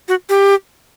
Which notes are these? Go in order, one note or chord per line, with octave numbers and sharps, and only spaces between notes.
F#4
G4